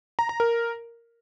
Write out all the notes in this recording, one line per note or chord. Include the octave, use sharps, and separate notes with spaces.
A#5
A#5
A#4